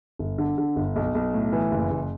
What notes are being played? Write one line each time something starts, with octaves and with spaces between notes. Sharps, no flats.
G1
D3
D3
G1
B1
B1
A2
E3
F#1
F#1